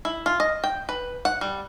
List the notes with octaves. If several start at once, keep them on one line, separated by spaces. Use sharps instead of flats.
E4
F4
D#5
G5
B4
F#5
G3